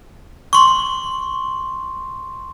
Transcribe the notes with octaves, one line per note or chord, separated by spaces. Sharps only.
C6 C#6